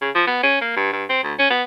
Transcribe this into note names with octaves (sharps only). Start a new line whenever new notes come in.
C#3
F3
B3
C#4
A#3
G2
G2
C4
D2
C#4
B3